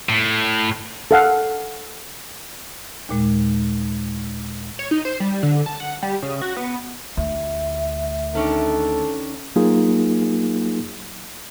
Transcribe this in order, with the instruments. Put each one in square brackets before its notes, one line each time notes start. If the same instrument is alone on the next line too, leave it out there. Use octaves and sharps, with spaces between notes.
[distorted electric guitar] A2
[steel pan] A4 F5 F#5
[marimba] D#2 A#2 G#3
[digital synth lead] C#5
D#4
C5
G3
D3
A5
F#5
G3
C#3
F#4
B3
[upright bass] D2 [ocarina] E5
[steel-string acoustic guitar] D#3 C#4 D4 [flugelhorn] A4
[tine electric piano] F#3 A#3 D#4 F4 G#4